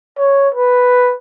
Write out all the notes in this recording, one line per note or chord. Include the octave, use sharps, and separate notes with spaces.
C#5
B4